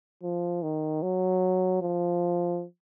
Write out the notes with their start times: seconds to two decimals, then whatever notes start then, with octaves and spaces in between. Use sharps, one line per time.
0.23 F3
0.62 D#3
1.02 F#3
1.82 F3